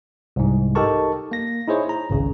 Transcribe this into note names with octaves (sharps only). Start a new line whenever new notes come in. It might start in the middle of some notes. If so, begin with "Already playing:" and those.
C2 G#2
D#4 G4 A4 A#4 A5 C#6
A#3 A#6
D#4 E4 G#4 C5 C#5
A#5
G#1 C#2 C#3